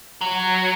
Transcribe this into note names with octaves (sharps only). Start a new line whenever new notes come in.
F#3